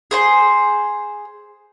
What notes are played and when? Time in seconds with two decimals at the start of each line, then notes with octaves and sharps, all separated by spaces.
0.11 G#4 C5 C6